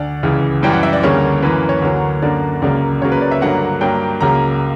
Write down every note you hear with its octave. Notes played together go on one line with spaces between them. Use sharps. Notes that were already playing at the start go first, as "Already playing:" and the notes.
Already playing: D2 D5
C#2 C#3 E3
F#2 E3 G3 G5
F#5
E5
D5
D2 C#3 G3 A#3 C#5
F#2 E3 A#3 B4
C#5
D2 D3 F#3 A#3
F#2 D3 A#3 D5
C#2 C#3 F#3 A#3 D5
C#2 C#3 F#3 A#3 C#5
B4
D5
E5
G2 D3 F#3 A#3 F#5
G2 F#3 A#3 G5
C#2 C#3 F#3 A#3 A#5